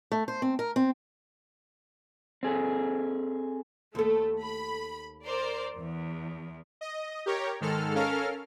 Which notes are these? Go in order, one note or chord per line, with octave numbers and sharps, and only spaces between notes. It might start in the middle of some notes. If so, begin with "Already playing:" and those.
A3
C5
C4
A#4
C4
C4 G#4 A4
D#2 A3 A4
B5
A#4 C5 D5
E2
D#5
G4 A#4 C#5
G#2 D#3 G#3 A4 F6
C#4 A4 A#4 F5 F6